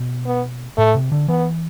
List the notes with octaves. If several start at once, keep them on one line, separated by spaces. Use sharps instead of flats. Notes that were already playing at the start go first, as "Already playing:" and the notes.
Already playing: B2
B3
A2 A3
C3
D3
E3 B3